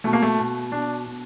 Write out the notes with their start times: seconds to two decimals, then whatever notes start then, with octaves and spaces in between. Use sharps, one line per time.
0.04 B2 A3
0.13 A#3
0.23 A3
0.39 B2
0.72 B2 D4
1.06 B2